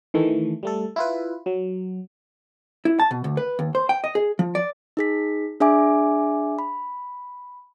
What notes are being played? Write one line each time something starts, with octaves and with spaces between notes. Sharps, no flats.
D#3 E3 A3
G3 A3 A4
E4 F4 B4
F#3
E4
A5
B2
D2
B4
D#2
C5
G5
D#5
G#4
F3
D5
D#4 G#4 B6
D4 G#4 E5 G#5 D6
B5